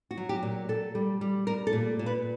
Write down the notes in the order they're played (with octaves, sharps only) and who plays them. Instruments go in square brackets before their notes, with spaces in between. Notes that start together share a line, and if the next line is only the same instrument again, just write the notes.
[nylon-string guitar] F#4
F#3
G4
A#2
A#2 A4
G3
G3
G3 A#4
A4
A#2
A#2
B4